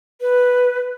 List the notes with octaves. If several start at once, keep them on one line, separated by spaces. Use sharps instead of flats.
B4